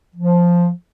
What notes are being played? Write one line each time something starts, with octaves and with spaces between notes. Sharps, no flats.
F3